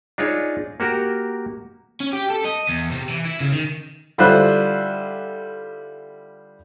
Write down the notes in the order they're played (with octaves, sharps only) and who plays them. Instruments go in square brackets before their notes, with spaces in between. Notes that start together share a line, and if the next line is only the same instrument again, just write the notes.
[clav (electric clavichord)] D4 D#4 F4 G#4 C#5
A#3 F#4 G4 A#4
[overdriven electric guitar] C#4
G4
A4
D#5
E2
C3
E3
E4
C#3
D#3
[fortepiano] D3 G3 E4 F4 C5 F#6